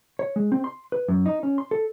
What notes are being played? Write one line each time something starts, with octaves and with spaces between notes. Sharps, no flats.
C#5
G#3
C4
C6
B4
F#2
D#4
C#4
C6
A4